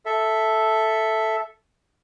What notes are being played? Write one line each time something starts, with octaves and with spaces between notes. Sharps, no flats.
A4 E5